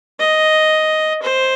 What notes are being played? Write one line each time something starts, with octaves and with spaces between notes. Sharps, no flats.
D#5
C5